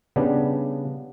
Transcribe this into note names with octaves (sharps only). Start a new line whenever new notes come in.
C#3 G3 B3 D4